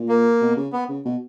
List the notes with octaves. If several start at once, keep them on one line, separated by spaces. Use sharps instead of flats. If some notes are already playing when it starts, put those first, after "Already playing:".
Already playing: A#2
A#3
B2
C#3
B3
C#3
B2